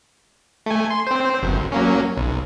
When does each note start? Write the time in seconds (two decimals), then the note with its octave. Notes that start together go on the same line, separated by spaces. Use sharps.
0.66 A3 G#5
0.91 C6
1.07 C4 C5
1.42 G1 F#2
1.72 F#3 A#3 C#4
2.17 B1